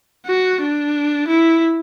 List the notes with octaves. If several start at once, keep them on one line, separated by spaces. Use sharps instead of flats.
F#4
D4
E4